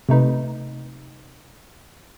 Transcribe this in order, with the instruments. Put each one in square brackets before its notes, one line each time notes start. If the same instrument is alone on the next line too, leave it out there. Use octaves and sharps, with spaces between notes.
[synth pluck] C3 A3 D#4 B4